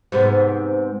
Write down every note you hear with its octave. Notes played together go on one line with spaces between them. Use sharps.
G#2 C3 B3